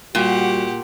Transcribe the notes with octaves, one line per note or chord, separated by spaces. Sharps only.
A#2 G3 F#4 G4 F#5